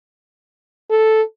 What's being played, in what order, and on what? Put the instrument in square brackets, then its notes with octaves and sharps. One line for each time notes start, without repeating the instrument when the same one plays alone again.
[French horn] A4